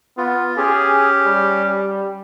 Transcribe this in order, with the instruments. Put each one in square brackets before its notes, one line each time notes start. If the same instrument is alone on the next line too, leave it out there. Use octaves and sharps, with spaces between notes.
[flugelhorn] B3 [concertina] F4
[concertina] C#4 G4 [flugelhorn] G#4
[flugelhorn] G3